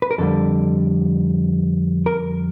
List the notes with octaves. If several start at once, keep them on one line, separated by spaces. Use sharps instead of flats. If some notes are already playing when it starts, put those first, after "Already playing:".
B4
A#4
F2 D3 G3 A4
A#4